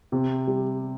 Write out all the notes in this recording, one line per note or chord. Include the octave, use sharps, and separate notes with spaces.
C3
G3